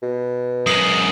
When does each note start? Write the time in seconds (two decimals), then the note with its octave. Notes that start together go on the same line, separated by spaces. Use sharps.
0.03 B2
0.67 F#2 G#3 D#6 C7 F#7